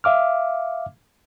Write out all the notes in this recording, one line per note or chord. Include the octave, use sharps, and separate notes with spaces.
E5 F5 D6 F6